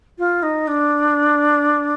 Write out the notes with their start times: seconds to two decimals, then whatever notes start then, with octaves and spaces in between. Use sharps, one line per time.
0.18 F4
0.42 D#4
0.67 D4